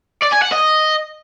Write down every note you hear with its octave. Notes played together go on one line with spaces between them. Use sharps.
D5
G#5
F#5
D#5